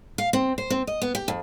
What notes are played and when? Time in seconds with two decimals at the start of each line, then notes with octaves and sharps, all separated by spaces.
0.18 F5
0.33 C4
0.58 C5
0.70 C4
0.87 D#5
1.02 B3
1.15 G4
1.28 F2